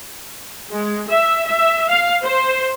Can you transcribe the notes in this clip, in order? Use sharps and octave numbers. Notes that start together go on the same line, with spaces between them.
G#3
E5
E5
F5
C5